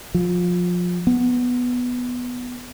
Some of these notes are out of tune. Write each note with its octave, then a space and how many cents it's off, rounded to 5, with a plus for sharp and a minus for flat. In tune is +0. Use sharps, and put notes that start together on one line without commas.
F3 +25
B3 +0